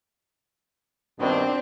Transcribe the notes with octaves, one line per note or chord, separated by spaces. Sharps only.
G2 B2 D#3 C4 D4